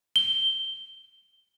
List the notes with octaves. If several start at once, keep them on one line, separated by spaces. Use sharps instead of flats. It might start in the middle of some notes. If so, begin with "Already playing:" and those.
G7